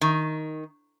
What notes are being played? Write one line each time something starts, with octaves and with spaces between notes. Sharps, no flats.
D#3